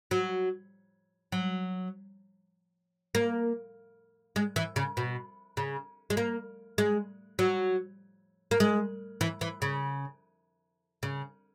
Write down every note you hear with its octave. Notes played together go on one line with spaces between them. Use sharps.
F#3
F#3
A#3
G#3
E3
C#3
B2
C#3
G#3
A#3
G#3
F#3
A#3
G#3
E3
E3
C#3
C#3